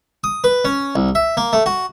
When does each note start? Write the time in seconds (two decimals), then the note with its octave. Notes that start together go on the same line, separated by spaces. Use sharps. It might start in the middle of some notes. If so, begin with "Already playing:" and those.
0.24 D#6
0.44 B4
0.65 C#4
0.95 C2
1.15 E5
1.37 A#3
1.53 A3
1.66 F#4